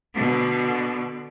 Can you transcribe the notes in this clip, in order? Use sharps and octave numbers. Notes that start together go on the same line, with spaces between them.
B2 D3